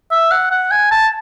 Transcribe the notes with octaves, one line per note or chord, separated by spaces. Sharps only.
E5
F#5
F#5
G#5
A5